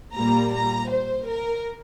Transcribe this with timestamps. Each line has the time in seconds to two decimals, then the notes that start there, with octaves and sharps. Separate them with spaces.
0.15 A#2 G3 A#3 A#5
0.53 A#5
0.91 C5
1.27 A#4